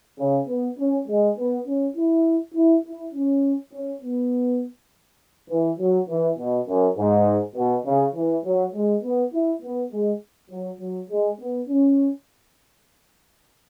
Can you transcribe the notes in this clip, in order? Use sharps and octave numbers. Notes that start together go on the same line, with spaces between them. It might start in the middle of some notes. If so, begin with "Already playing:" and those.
C#3
B3
C#4
G#3
B3
C#4
E4
E4
E4
C#4
C#4
B3
E3
F#3
E3
B2
F#2
G#2
B2
C#3
E3
F#3
G#3
B3
E4
B3
G#3
F#3
F#3
G#3
B3
C#4